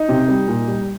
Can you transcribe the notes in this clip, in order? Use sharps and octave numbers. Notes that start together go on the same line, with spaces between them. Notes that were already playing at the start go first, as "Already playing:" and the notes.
Already playing: D#4
C3
G3
A#2
G3